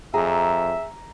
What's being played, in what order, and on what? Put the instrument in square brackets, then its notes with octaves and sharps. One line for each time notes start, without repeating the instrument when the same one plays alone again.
[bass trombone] F2 [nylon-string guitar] G#4 [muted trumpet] E5 [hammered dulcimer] A#5